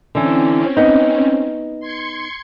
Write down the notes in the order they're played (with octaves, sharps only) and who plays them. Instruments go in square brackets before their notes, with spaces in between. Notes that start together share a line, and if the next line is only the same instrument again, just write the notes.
[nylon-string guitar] D3 E3 [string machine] C4 C#4
[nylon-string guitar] B3 D#4
[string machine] C6 G#6 C#7